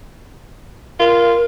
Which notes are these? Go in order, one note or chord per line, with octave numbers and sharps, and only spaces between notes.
F4 A#4